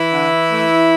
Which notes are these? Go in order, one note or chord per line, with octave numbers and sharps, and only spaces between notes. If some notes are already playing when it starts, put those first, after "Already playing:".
Already playing: E3 E4
D3
A3